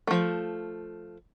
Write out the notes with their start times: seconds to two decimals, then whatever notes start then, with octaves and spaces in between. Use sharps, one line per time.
0.07 F3 A3